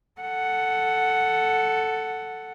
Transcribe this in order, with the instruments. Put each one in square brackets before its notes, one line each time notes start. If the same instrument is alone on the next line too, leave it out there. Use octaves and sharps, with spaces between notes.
[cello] A4 F#5